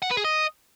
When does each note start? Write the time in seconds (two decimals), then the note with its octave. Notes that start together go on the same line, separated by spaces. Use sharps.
0.02 F#5
0.10 B4
0.17 G#4
0.24 D#5